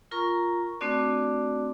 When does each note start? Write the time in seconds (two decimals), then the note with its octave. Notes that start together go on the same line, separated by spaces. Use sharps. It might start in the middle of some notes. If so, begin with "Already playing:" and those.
0.11 F4 A#4 A#5 C#6
0.81 A3 C4 D4 F#4 D5